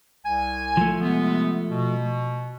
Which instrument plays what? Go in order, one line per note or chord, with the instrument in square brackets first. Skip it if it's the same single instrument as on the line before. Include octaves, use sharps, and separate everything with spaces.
[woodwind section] C2 G#5
[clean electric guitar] F3 A3
[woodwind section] C3 G#3 B3
B2